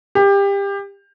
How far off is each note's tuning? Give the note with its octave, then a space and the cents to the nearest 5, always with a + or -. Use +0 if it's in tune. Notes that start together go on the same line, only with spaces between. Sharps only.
G4 +25